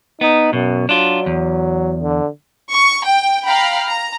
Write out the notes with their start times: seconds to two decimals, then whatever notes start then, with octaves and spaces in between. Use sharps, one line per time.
0.21 B3 D#4
0.53 F#2 B2
0.89 F#3 D4 F4
1.26 E2
2.02 D3
2.71 C#6
3.05 G5
3.45 F5 G5 A#5 B5
3.86 A#5